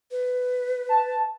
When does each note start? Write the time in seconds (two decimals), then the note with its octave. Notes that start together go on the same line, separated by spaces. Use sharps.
0.11 B4
0.89 A5